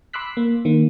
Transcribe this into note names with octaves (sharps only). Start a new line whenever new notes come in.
B5 C6 D6 E6 F#6 B6
A#3
D#3 A#3